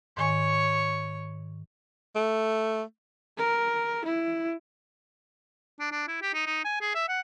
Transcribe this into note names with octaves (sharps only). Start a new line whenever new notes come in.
G#2 D#3 C#5 G#5 C#6
A3
A#4
E4
D4
D4
E4
G4
D#4
D#4
G#5
G#4
E5
F#5